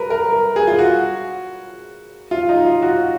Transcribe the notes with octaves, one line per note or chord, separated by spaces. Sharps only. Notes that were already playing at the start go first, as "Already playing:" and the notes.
Already playing: A#4 B4
A#4
A#4
G#4
F4
F#4
F4
D#4
F4
F#4